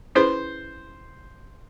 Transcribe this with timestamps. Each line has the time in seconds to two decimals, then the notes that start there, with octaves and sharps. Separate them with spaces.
0.15 C#4 E4 G#4 B4 C5